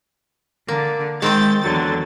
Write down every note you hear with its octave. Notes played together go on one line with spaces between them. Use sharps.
D3 A#3
D#3 G#3 C4 G5 G6 A6
E2 D3 F#3 A6